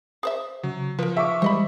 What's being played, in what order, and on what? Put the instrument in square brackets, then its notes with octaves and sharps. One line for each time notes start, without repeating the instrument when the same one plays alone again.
[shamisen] G#4 C5 E5
[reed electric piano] C#3 [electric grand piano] F#3
[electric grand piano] F3 [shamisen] A#4 B4
[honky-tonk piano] E5 C#6 D6 [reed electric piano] F5
[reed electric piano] E3 G3 G#3 [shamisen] C5 D#5 B5